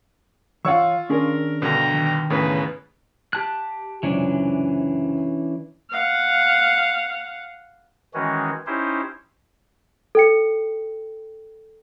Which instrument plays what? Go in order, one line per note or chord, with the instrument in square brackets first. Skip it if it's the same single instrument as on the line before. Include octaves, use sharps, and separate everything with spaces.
[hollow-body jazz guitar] E3 C#5 F#5 [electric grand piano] F4 C#6 [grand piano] F5 E6
[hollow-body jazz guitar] D#3 C#4 G#4 [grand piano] D4 [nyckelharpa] A#4
[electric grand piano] G2 B2 D3 [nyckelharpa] G5 A#5
[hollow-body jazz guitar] D#3
[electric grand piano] E2 A2 C#3 [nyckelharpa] B4
[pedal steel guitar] G4 A5 F#6
[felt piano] C#2 F#2 C3 [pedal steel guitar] E3 C#4 D4
[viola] F5 F#5
[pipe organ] D#3 E3 G#3 C#4 F#4
C#4 D#4 E4 G4 C5
[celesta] A4 G5 C#7